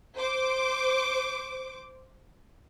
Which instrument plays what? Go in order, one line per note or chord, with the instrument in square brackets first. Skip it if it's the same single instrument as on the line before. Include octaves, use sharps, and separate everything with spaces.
[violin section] C5 D6